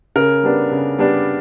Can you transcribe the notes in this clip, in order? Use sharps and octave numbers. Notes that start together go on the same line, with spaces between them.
C#3 A#4
G3 B3 D4
C#3
G3 B3 D4